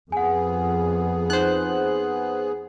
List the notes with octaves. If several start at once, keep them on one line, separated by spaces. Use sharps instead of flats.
F2 B3 G#4 F#5 G#5
D#4 C5 F#6